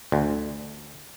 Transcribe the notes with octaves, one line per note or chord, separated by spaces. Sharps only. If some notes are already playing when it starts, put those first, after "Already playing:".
D2